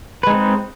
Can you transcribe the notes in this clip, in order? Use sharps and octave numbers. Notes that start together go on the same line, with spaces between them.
G#3 C4 D#4 B4